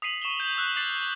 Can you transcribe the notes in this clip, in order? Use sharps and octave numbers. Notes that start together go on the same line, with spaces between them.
D#6 B6 C7 D#7 F#7
C#6 E7 F7 G7
G6 D#7 F#7
E6 F#6
D6 A6 C7